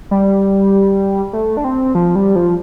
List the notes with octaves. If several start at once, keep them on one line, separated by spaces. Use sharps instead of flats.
G3
A3
D4
C4
F3
G3
F3